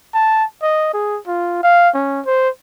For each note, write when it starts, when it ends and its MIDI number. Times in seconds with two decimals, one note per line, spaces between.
0.14 0.44 81
0.63 0.92 75
0.94 1.18 68
1.27 1.61 65
1.63 1.89 77
1.94 2.20 61
2.26 2.49 72